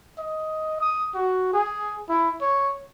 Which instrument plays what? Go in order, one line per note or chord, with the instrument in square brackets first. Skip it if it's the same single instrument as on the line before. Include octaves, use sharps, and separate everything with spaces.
[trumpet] D#5
D#6
F#4
G#4
E4
C#5